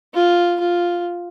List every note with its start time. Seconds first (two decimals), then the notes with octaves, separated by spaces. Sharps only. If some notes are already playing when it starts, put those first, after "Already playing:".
0.14 F4
0.60 F4